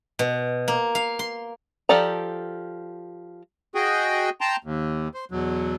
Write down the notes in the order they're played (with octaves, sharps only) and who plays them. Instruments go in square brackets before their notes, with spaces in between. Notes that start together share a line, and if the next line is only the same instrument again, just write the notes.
[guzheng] B2
A#3
F5
C6
[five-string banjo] F3 G4 A4 D5 A#5
[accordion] F#4 G#4 D#5 G5
G5 A5 A#5 C6
D#2
C5
E2 B2 F#3